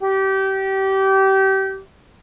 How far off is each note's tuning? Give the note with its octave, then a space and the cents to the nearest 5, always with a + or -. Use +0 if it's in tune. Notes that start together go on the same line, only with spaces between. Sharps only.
G4 -25